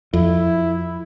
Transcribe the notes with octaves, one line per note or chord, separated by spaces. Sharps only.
F2 E4